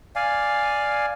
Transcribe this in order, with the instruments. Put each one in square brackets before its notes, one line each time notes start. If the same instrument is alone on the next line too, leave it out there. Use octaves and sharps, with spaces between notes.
[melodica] D5 F5 G#5